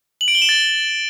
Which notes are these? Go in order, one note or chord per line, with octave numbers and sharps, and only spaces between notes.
F#7
D7
G7
E7
A6